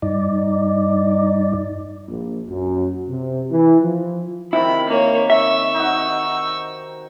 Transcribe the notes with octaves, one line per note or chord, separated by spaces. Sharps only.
G2 D#4 D5
A#1
F#2
C3
E3
F3
C3 D#3 E4 B5
A#3 C#5
E5 C#6 E6
D#4 F#4